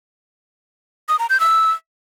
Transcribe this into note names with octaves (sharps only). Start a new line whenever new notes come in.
D#6
A#5
G6
E6